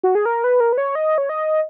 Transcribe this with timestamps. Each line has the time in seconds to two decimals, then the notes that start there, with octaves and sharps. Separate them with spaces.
0.03 F#4
0.15 G#4
0.25 A#4
0.44 B4
0.60 A#4
0.73 B4
0.78 C#5
0.95 D#5
1.18 C#5
1.29 D#5